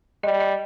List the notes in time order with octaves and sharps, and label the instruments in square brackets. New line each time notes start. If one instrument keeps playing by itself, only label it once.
[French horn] G3 [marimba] D#5
[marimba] D#5